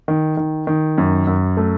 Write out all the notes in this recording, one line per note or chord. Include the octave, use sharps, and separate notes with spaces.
D#3
D#3
D#3
F#2
F#2
A3